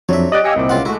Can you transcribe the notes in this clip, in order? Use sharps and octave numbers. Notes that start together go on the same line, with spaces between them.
F2 F#3 C4 D4 C#5 E5
G4 D5 D#5 F#6 D7 F#7
G4 F5 G#5 E6 A#6 C#7
C2 A#2 C4 D6
C#2 F4 F#5
G#3 A3 E4 F#4